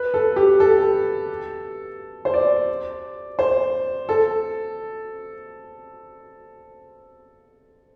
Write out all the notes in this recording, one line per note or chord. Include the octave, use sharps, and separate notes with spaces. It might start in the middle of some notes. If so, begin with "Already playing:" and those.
Already playing: B4
A4
G4
A4
C5
D5
C5
A4